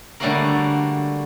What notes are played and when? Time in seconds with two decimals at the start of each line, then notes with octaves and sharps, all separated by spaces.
0.20 D3 G3 A3 A#3 F#4 A#4